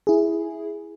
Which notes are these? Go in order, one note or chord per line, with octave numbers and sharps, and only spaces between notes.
E4 G#4